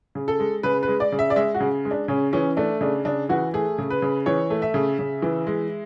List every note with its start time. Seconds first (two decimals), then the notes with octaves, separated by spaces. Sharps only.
0.15 C#3
0.28 A4
0.40 G#3
0.63 C#3 B4
0.83 B4
0.88 G#3
1.00 D5
1.12 C#3
1.19 E5
1.30 D5
1.36 G#3 E5
1.54 F#4
1.60 C#3
1.85 G#3
1.91 D4
2.08 C#3 C#4
2.33 E3 C#4
2.57 A3 D4
2.81 C#3 D4
3.05 C#3 D4
3.29 E3 F#4
3.54 A3 G#4
3.78 C#3
3.90 B4
4.02 C#3
4.26 E3 C#5
4.50 A3
4.62 E5
4.74 C#3
4.99 C#3
5.22 E3
5.47 G#3